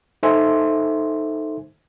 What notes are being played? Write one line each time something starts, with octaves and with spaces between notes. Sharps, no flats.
D#4 A4 C5 E5 G#5 C6